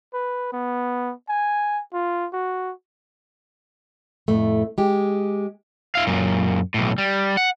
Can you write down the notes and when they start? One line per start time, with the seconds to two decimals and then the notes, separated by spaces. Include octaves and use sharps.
0.14 B4
0.53 B3
1.29 G#5
1.93 F4
2.33 F#4
4.28 F2 A2 A3
4.78 G#3 G4
5.95 E4 F5
6.07 F#2 A#2
6.74 B1 A2
6.98 G3
7.37 F#5